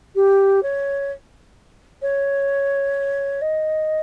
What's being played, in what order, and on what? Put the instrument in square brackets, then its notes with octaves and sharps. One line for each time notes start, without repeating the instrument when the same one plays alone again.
[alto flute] G4
C#5
C#5
D#5